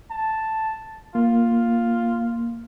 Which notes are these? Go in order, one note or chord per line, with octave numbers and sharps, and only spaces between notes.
A5
A#3 F4